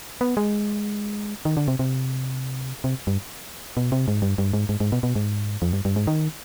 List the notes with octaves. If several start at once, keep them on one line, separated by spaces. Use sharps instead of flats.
B3
G#3
D#3
D3
C3
C3
C3
G2
B2
C3
G#2
G2
G2
G#2
G#2
G#2
B2
B2
G#2
F2
G2
G2
G#2
D#3